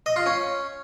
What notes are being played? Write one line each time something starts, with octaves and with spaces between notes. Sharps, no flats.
D#5
F4
C#4